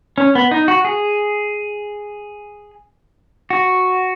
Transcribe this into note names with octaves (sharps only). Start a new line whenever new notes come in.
C#4
B3
D#4
F#4
G#4
F#4